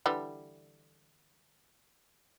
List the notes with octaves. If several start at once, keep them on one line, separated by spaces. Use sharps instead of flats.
D3 E3 G3